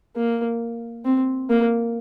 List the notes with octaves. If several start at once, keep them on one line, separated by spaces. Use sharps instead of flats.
A#3
C4
A#3